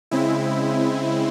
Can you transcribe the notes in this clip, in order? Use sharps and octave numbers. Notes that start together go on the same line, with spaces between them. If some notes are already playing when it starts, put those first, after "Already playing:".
C#3 G#3 C4 E4